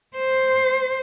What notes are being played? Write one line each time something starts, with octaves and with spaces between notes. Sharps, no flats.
C5